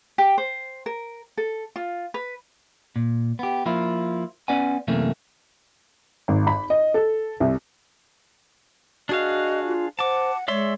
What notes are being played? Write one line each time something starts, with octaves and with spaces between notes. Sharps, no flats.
G4
C5
A#4
A4
F4
B4
A#2
B3 G4
F3 A#3 E4 F4
B3 C#4 B4 D5 F#5 G#5
F#2 C3 E3 A3 A#3 C#4
G#1
B5
D#5
A4
C2
D4 F#4 G#4 D#5 F5
F4
C5 F#5 A5 D6
G#3 C#5 D5 E5 C6